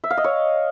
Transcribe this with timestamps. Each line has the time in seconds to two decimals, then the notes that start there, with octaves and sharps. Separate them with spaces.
0.04 E5
0.10 F5
0.17 D#5
0.24 C#5